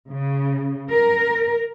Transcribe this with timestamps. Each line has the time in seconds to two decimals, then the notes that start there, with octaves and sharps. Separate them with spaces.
0.10 C#3
0.90 A#4